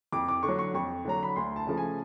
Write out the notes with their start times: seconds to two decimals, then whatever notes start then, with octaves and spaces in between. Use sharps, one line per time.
0.12 F2 D6
0.29 D6
0.43 D3 C#6
0.48 F#3
0.59 C#6
0.74 F2 C#6
1.05 D3 F#3 A#5
1.23 B5
1.36 D2 C6
1.56 A5
1.67 C#3 F3 A3
1.77 G#5